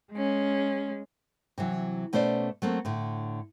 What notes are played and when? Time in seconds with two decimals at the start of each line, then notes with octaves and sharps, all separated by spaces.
0.12 G#3 C#4
1.58 C3 E3 F#3
2.13 B2 A3 C#4 C5 D5
2.62 F#3 A3 A#3 C4
2.85 A2 D3